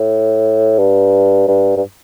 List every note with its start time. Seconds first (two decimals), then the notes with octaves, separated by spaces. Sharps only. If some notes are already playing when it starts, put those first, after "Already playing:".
Already playing: A2
0.79 G2
1.48 G2
1.77 G2